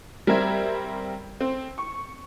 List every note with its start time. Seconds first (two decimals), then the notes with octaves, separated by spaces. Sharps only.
0.27 G3 C4 A#4 E5 G#6
1.41 C4
1.78 C#6